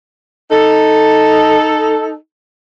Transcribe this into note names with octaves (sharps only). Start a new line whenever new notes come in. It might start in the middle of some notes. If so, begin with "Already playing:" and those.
D#4 A4